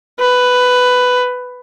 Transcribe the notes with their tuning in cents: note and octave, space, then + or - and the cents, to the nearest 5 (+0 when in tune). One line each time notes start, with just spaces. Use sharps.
B4 +10